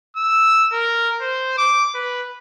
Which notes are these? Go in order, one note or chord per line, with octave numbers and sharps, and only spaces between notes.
E6
A#4
C5
D6
B4